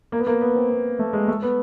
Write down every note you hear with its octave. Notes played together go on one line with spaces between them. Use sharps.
A#3
B3
A#3
B3
C4
B3
A3
G#3
A3
B3